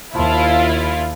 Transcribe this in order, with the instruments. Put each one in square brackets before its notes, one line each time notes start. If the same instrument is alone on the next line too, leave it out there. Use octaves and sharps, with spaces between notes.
[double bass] D#2 [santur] F3 F5 [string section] E4 F4